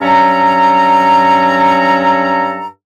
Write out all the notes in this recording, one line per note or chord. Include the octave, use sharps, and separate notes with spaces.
G2 F#3 C#4 A4 A#5